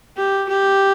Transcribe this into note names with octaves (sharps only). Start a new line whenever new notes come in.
G4
G4